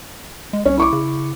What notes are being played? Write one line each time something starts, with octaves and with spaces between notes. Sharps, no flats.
G#3
C2 C#4
E4 C#6 D6
C#3